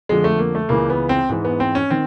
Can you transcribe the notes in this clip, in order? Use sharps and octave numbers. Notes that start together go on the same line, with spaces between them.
F2 D3 F3 G#3
A3
A#3
A3
C#2 C#3 E3 A#3
B3
C4
G#2 E3
B3
C4
C#4
D#3 C4